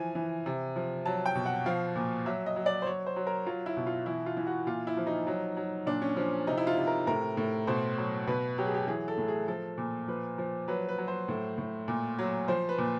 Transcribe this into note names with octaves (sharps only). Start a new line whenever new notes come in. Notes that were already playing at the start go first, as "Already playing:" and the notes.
Already playing: E3 F3 G#5
E3
C3
F3
F#3 A5
G5
B2
F#5
F3 F5
A#2
F#3 E5
D#5
F#3
D5
C5
F#3 C#5
C5
F#3
A#4
F#3 F4
E4
B2
F4
E3 E4
F4
E3
F#4
A#2 F4
E4
F3
D#4
F#3
F#3
A#2 D4
C#4
F3 C#4
C3 D#4
E4
F4
C3
A#4
A2 A#4
A2
B2 C5
F#3
B2 B4
F#3 G4
G#4
G4
E3 G#4
A4
A2
G#4
F3 A4
A#2
F3 B4
F3
F#3 B4
B4
F#3
C5
A2
A2
A#2
F#3
F3 C5
B4
A#2